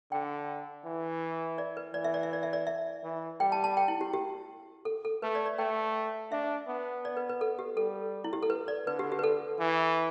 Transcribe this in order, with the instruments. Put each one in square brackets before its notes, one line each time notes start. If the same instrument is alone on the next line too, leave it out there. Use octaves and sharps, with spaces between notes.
[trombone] D3 [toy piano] G5
[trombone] E3
[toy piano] D5
B4
[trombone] E3 [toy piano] D5
[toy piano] E5
D5
E5
D5
E5
D5
E5
[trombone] E3
[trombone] G3 [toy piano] G5
[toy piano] A5
A5
G5
E4
G4
G4
A4
A4
[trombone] A3 [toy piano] B4
[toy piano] D5
D5
[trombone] A3 [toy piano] G5
[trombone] D4 [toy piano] E5
[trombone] B3
[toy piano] D5
B4
B4
A4
G4
[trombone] G3 [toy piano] A4
[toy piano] E4
G4
A4
B4
D5
[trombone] D3 [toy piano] B4
[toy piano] G4
G4
B4
A4
[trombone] E3